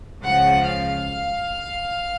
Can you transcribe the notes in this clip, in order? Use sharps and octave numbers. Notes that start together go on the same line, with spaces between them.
C#2 C#3 F3 F#5
F5